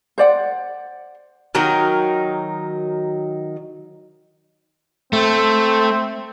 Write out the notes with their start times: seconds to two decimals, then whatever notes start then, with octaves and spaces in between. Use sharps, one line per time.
0.18 C5 D5 F#5
1.55 D#3 F#3 D#4 A#4
5.13 A3 C4